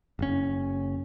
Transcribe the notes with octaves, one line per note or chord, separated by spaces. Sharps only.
F#1 C#4